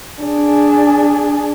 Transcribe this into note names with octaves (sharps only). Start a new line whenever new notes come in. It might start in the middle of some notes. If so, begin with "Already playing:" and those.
D4 G#4